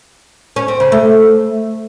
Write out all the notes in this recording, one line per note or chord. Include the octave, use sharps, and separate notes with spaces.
C#4
C4
C#3
A3